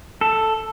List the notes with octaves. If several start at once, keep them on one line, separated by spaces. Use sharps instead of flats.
A4